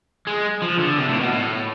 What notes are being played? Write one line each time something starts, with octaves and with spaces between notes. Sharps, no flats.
G#3
F3
D3
C3
A2
B2
A2